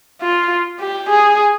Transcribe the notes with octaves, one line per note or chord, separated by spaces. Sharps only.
F4
G4
G#4